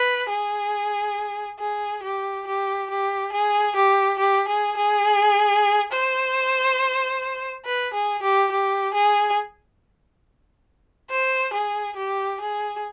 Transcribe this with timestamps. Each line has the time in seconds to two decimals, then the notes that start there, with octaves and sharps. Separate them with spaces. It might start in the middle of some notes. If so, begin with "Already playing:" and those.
Already playing: B4
0.29 G#4
1.59 G#4
2.03 G4
2.47 G4
2.90 G4
3.32 G#4
3.76 G4
4.18 G4
4.48 G#4
4.77 G#4
5.92 C5
7.65 B4
7.93 G#4
8.22 G4
8.51 G4
8.94 G#4
11.10 C5
11.53 G#4
11.96 G4
12.41 G#4